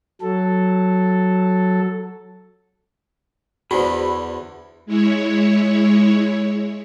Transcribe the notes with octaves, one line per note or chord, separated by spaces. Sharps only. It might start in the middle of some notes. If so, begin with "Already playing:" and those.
F#3 A4
E2 D3 E3 F#4 G#4 C5 B5
G#3 E4 C#5